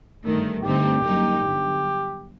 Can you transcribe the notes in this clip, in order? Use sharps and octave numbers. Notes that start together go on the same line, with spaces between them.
G1 G2 D#3 A3
G2 D3 A3 C4 D#4 G4
F#2 D3 G3 A#3 D#4
G1 G2 D3 F#3